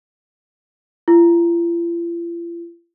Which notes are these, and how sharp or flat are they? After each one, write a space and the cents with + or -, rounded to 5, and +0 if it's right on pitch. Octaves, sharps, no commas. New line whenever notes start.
F4 -45